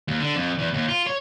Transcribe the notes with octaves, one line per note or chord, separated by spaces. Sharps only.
D#2
D3
F2
E2
D#2
F4
C#5